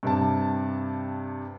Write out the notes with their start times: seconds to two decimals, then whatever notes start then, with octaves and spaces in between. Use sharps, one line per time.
0.03 G2 C3 A5